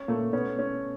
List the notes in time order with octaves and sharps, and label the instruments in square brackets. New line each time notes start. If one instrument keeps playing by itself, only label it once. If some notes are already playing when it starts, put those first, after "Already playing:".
Already playing: [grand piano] C#4
[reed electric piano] A#2 A#3 [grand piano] A3
[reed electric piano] B2 B3 [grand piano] C#4
[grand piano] C#4